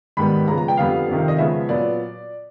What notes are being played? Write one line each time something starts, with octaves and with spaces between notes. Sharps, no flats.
G#2 D#3 G3 B3 B5
C#3 F3 G#3 B3 A#5
A#5
G5
F2 D3 G3 B3 F5
F2 C3 D#3
D#5
C#3 F3 G#3 B3 E5
A#2 F#3 B3 D5